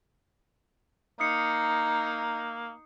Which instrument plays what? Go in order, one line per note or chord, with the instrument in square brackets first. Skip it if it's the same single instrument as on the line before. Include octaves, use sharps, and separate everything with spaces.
[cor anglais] A#3 [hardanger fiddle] D#4 [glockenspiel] D#6 C7 C#7